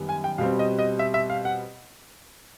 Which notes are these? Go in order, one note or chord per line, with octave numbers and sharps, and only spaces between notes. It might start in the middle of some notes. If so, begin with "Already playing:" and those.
Already playing: F#2 D#3 G3 B3
G#5
G5
B2 G3 C4 F5
D#5
D#5
E5
E5
F5
F#5